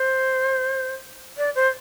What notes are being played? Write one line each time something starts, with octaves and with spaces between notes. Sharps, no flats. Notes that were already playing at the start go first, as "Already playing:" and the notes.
Already playing: C5
D5
C5